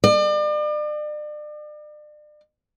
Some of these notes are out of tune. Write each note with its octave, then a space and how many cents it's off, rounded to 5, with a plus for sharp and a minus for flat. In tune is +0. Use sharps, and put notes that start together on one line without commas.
D5 +40